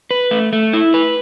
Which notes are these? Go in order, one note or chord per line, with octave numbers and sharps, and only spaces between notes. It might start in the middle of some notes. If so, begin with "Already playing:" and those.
B4
A3
A3
E4
B4